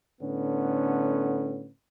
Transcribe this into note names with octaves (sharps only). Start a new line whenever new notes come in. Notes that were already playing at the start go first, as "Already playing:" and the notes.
A2 D3 B3 C#4